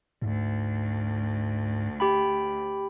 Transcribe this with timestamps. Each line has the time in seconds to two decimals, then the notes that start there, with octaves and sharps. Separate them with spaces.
0.22 D2 G#2
2.00 G4 G5 B5